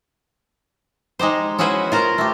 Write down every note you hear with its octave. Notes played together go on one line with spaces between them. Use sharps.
G#3 D#4 G4 C5
C#4 E4 F#4 G#4 B4 C5
F4 A#4 C5 A#5
A3 G4